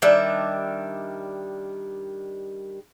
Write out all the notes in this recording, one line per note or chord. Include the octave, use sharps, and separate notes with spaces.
D#3 G3 D4 E5